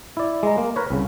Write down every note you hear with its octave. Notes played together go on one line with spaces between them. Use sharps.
E4 D5
G#3 A#5
A#3
A#4 B4 C#5
C2 C#3